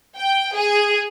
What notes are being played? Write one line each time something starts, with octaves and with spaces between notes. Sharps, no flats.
G5
G#4